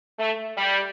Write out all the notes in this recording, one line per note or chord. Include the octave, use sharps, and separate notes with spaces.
A3
G3